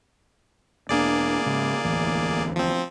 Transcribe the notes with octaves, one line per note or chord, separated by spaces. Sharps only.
E1 A#3 D4 G#4 D5
G#2 C#3
D1 A1 E2
F3 C4